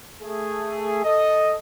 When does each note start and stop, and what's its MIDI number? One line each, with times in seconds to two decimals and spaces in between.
0.22 1.03 57
0.22 1.03 68
1.04 1.55 69
1.04 1.55 75